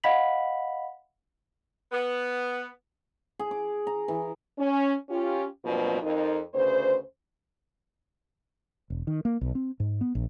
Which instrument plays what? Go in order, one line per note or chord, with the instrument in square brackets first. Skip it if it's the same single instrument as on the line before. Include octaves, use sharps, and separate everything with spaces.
[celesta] D#5 F5 F#5 B5 B6 F#7
[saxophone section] B3
[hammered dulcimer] G#4
D6
A#5
E3
[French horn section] C#4
C#4 F4 G4
G2 B2 F3 F#3 A#3 C4
F2 D#4 A#4
D2 C#3 B4 C5
[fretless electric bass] E1
D#3
A#3
B1
C4
G#2
B3
A#1